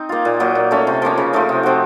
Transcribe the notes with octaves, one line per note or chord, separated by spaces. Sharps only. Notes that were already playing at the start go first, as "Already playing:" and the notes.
Already playing: C4 D#4
A#3 F4
A#2
F#3 A#3 D#4
A#2
A3 C#4 F4
C3
F3 A#3 C#4
C#3
F3 A3 D#4
C3
F3 C4 F#4